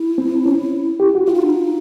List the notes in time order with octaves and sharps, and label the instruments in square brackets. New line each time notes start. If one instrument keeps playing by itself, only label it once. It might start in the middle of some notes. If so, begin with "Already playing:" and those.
Already playing: [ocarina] E4
[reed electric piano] C4
C#4
G4
F#4
[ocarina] E4 [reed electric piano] F4
[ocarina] D#4
D4
D#4